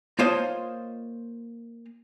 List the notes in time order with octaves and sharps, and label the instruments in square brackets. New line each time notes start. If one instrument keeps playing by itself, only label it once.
[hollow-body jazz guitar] A#3 F4 C5 C#5 D#5 A5